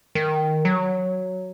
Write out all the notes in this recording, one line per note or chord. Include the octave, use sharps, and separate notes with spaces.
D#3
F#3